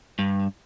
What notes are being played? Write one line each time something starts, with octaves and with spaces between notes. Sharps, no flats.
G2